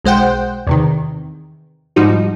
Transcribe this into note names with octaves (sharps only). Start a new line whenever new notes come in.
B1 G#3 C5 F#5 G5
E2 C3 D#3
G#2 F3 G3 D#4 F#4